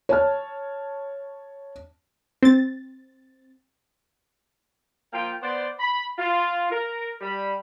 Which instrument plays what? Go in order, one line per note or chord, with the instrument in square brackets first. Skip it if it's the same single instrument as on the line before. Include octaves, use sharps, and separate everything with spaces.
[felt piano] C#5 A5 F6
[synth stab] C4 A6
[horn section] F3 A#3 F4 G5
B3 C5 D5
B5
F4
A#4
G3 B5